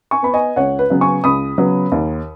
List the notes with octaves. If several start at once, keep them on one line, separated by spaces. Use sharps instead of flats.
G#5 C#6
B3 B5
D#5 G#5
C#2 C#5 F#5
B4
C#3 F#3 B3
G#5 C#6
C#2 B5 D#6
C#3 F#3 B3
D#2